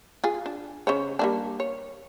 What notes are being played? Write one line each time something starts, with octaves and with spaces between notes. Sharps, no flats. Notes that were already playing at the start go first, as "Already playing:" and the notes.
F4 G#4
D4
C#3 C5 C#5
G3 A#3 D4
C#5